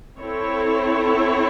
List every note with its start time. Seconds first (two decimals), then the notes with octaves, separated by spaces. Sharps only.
0.19 C4 E4 A4 C#5